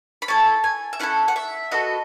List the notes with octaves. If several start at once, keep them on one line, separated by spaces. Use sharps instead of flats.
B5
C#4 E4 A4 A5
G#5
E5
C#4 E4 A4 F#5
F#5
E5
B3 F#4 A4 D#5